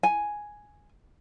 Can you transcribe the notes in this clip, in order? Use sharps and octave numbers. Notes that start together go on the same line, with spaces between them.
G#5